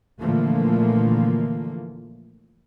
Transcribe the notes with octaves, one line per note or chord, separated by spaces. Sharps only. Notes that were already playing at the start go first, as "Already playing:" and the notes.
A#2 D3 E3 F3 A3 A#3